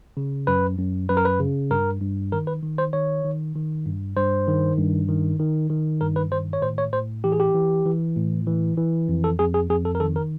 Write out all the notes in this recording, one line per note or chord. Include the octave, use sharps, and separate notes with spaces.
C#3
F#2 B4
F#2
F#2 B4
A#4
B4
C#3
G2 A#4
G2
D#3 A#4
B4
D#3
C5
D#3 C#5
D#3
D#3
G2
G2 C5
D#3
G2
D#3
D#3
D#3
G2 A#4
B4
D#3 C5
C#5
A2 C5
C#5
A2 C5
E3 G4
G#4
G4
E3
E3
A2
E3
E3
F2
A4
F2 G#4
G#4
F2 G#4
A4
A#4
D#3 A4
A#4